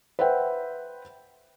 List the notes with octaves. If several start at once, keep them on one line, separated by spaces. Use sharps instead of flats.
B4 C5 E5 F#5 G5